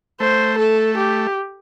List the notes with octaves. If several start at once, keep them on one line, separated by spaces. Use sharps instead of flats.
A3 C5
A4
G4